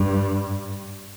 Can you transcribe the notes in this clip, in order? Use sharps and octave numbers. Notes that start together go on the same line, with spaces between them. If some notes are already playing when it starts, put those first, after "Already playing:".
Already playing: G2